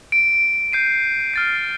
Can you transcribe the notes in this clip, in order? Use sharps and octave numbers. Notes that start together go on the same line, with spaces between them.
D7
G6 C7 D#7
F6 A6 C7